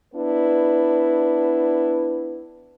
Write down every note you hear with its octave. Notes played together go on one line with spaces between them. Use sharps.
B3 D4 E4 B4